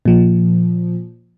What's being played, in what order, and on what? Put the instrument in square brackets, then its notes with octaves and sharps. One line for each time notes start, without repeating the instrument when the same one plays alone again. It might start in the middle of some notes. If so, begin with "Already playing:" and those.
[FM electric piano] A#2 F3